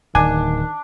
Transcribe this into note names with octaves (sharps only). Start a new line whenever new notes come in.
D1 D#3 D4 G#5